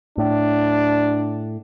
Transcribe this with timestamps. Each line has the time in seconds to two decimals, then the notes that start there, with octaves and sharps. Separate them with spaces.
0.18 A2 D4